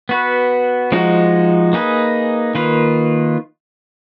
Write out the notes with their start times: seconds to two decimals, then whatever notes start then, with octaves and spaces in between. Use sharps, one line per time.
0.09 B3 F#4 B4
0.92 F3 G#3 D#4 F#4
1.73 A#3 D#4 G#4 B4
2.55 D#3 A#3 F4 B4